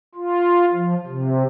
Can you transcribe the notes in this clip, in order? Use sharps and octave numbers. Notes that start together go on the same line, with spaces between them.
F4
F3
C3